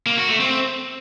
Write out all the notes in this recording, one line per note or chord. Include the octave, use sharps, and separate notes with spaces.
A#3
F#4
A3
C4